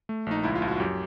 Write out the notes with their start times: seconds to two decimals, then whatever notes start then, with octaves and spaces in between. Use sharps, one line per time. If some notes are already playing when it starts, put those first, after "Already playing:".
0.09 A3
0.26 A#1 D#4
0.43 C#2 E4
0.55 F4
0.62 C#2
0.68 F#4
0.80 F#2 G4